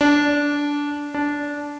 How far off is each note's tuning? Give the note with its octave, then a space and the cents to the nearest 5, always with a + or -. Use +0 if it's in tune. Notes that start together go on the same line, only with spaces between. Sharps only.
D4 -15
D4 -15